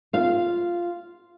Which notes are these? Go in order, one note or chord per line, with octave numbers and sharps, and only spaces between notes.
F4 F5